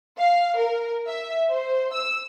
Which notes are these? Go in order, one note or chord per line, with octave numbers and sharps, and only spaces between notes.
F5
A#4
E5
C5
E6